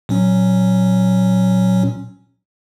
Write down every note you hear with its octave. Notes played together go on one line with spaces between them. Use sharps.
A#2 F#3 C#4